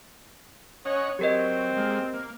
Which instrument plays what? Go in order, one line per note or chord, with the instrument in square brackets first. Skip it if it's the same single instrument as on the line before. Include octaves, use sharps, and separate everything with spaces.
[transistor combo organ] C#4 D#5 F#5 [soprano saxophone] C#5
[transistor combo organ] F#3 [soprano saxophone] C4 [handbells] G4 A#4 D#5
[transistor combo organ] G#3 A#3
A#3